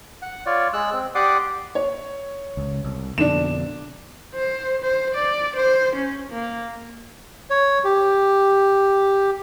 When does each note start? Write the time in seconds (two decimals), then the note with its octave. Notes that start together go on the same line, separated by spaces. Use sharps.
0.22 F#5
0.46 F4 C#5 D5
0.73 G#3 E6 F#6
0.93 C4
1.15 G4 D5 F#5 C6 D6 D#6
1.75 C#5
2.57 C#2
2.84 C2
3.18 F2 B2 D3 D4 E7
4.35 C5
4.82 C5
5.15 D5
5.56 C5
5.96 C#4
6.30 A#3
7.50 C#5
7.84 G4